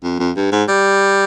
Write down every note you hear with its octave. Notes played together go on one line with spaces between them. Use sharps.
F2
F2
G2
G#2
G3